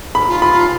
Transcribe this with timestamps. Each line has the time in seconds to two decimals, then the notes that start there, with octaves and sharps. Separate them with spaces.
0.15 B5
0.29 F4
0.42 B5